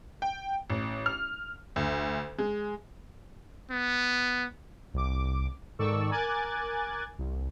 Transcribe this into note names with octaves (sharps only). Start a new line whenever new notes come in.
G5
A1
F6
D2
G#3
B3
C2 D6
G#2 D#3 A4 D5 C#6 E6
A#4 G#5 D6 F#6 G#6 A6
C2